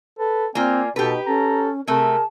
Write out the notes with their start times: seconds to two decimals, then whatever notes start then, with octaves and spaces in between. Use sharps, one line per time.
0.19 A4 B4
0.55 A#3 C4 F4 D5 G#5
0.96 B2 D#4 G4 A4 B4
1.26 C#4 A4 A#5
1.87 C3 A3 G#4 A#4 A5